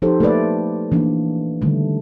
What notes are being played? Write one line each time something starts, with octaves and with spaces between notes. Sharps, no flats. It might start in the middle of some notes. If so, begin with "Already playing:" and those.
F3 D#4 G4 A4 C5
A3 A#3 B4 D5
E3 A#3 D4
D3 D#3 G3 A3